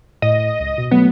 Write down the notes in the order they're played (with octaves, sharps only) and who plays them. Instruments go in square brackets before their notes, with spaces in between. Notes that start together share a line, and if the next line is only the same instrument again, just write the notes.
[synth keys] A2 [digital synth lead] D#5
[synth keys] C#2
B2
[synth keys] F#3 A3 [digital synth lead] B3